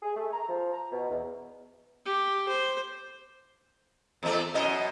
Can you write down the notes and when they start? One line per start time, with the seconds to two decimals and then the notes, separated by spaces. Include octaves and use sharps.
0.03 G#4
0.16 A3
0.33 A#5
0.48 F3
0.72 A#5
0.92 B2
1.09 E2
2.06 G4
2.49 C5
4.23 E2 A3
4.54 F#2 B2 D#5